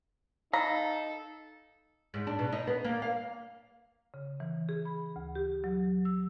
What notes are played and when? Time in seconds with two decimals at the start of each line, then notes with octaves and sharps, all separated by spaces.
0.53 D#4 A4 F5 A#5 B5
2.14 G#2
2.27 D4
2.39 B2
2.52 D#4
2.67 B3
2.84 A#3
3.02 F5
4.14 C#3
4.40 E3
4.69 G#4
4.85 B5
5.16 D2
5.35 G4
5.64 F#3
6.05 E6